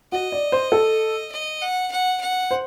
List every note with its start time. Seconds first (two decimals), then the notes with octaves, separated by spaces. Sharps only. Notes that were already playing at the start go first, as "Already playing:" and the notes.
0.12 F#4 D#5
0.32 D5
0.52 C5
0.72 A4
1.32 D#5
1.62 F#5
1.92 F#5
2.21 F#5
2.51 C5